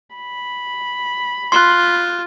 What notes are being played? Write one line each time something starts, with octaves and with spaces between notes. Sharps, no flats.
B5
F4 C6 F#6